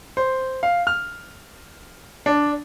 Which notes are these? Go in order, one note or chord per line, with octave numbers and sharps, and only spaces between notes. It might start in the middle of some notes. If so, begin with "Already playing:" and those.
C5
F5
F6
D4